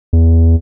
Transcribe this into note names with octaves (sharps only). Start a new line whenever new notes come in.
E2